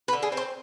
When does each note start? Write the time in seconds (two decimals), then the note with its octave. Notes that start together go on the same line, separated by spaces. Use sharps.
0.08 B4
0.13 D3
0.22 G#4
0.32 C4
0.37 C5